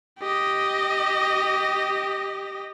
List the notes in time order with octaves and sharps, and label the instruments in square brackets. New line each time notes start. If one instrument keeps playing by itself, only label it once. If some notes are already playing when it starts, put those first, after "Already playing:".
[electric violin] G4 D#5